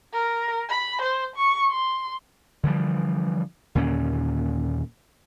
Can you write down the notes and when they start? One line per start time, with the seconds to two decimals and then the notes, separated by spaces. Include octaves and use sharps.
0.13 A#4
0.69 B5
1.02 C5
1.36 C#6
1.71 C6
2.63 D3 E3 F3 G3
3.75 D#2 A#2 D3 C#4